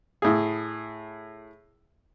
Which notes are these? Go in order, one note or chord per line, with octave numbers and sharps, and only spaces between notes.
A2 G#4